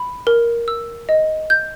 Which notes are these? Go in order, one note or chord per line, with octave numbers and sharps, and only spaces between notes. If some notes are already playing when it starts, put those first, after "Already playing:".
Already playing: B5
A#4
E6
D#5
G6